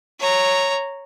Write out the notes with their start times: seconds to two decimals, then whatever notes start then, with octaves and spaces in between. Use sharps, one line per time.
0.19 C#5 A#5